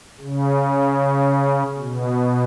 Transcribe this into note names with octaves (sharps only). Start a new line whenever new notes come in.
C#3
B2